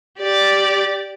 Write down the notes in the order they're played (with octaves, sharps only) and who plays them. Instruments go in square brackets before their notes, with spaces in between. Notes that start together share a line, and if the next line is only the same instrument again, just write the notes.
[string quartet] G4 D5 A6